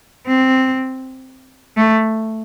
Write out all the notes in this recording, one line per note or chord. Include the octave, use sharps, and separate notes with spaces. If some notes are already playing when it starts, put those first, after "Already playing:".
C4
A3